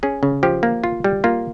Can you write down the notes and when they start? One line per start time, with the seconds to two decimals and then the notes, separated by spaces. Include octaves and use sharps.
0.03 C#4 G#4
0.23 C#3
0.43 F3 G4
0.63 A#3
0.84 F4
1.04 G3
1.24 A#3 F4